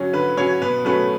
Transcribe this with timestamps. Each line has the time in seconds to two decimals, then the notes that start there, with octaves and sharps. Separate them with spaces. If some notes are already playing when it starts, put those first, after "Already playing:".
Already playing: D3 F#3 C#4
0.13 D3 B4
0.37 F#3 C#4 C#5
0.62 B2 B4
0.85 F#3 A3 C#4 B4